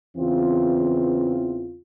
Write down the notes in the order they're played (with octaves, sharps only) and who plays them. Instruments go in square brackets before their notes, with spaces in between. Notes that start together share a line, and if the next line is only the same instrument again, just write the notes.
[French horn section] E2 C#3 E3 C4 F4